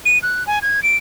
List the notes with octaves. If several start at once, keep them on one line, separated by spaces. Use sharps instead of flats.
D#7
F#6
G#5
G#6
D7